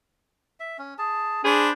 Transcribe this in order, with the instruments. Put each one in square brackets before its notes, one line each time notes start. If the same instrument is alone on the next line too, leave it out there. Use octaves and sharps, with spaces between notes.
[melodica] E5
C#4
G#4 A5
[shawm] D4 [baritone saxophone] G#4 [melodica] C5 B5